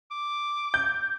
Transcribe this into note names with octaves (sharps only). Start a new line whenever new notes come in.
D6
G6